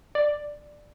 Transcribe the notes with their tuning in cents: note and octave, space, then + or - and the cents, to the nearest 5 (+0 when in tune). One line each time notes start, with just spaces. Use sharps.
D5 +10